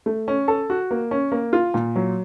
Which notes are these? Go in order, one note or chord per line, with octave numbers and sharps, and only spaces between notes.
A3
C#4
A4
F#4
A#3
C#4
A#3
F4
A#2
F#3